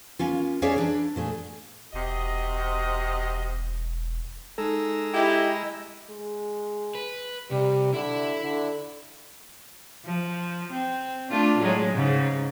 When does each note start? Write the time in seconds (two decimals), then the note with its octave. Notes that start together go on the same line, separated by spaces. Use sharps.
0.19 A#3 C#4 F4
0.62 C#4 G#4 C#5 D5 E5 F5
0.76 E3 D4
1.16 A#2 A3 G#4
1.93 E1 C3 F#4 D#5
4.58 G#3 D#4 A4 A#5 E6
5.14 E4 G4 D#5
6.10 G#3
6.95 B4
7.51 C3 G3
7.94 D3 E4 B5
8.43 D3
10.05 F3
10.72 C4
11.31 A3 D4 F4
11.59 A2 F#3 G#3
11.94 G#2 C#3